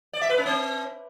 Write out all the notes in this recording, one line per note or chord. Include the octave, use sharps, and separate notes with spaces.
D5
E5
B4
C#4
C4